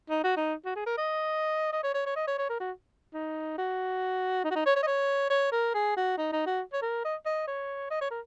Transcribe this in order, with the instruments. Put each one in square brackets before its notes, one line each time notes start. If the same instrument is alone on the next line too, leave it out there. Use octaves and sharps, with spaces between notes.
[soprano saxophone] D#4
F#4
D#4
F#4
G#4
A#4
D#5
D#5
C#5
C#5
C#5
D#5
C#5
C#5
A#4
F#4
D#4
F#4
D#4
F#4
D#4
C#5
C#5
D#5
C#5
C#5
A#4
G#4
F#4
D#4
D#4
F#4
C#5
A#4
D#5
D#5
C#5
D#5
C#5
A#4